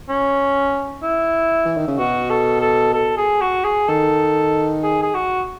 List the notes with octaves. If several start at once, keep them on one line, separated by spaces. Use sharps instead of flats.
C#4
E4
E3
D#3
C#3
B2 F#4
A4
A4
A4
G#4
F#4
G#4
D#3 A4
G#4
G#4
F#4